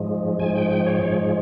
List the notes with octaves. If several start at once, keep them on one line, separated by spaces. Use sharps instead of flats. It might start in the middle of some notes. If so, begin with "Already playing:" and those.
Already playing: G#2 F3 G#3
G#2 F3 G#3 G#5
G5
G5
C#5
G#2 F3 G#3 C#5